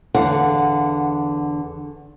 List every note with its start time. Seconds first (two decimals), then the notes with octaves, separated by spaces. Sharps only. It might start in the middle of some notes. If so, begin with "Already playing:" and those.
0.14 E2 D3 F5 F#5